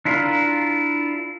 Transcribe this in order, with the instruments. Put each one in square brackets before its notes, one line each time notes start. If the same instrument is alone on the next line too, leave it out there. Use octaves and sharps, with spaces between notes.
[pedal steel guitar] D4 E4 F4 A#4